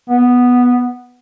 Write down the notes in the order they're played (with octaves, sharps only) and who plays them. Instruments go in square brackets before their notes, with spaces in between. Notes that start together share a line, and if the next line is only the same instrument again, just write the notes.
[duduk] B3